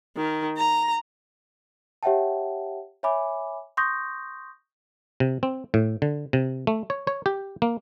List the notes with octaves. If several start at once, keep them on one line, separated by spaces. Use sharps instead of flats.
D#3
A#5
G4 C#5 E5 F#5 G5 A5
C#5 E5 G#5 B5 D6
C6 C#6 D#6 G6 A#6
C3
C4
A2
D3
C3
A3
C#5
C#5
G4
A#3